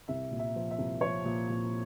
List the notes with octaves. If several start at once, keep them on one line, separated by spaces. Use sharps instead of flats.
C2 E5
A#2
E5
F3
E5
C2
F3 C#5
A#2
A#2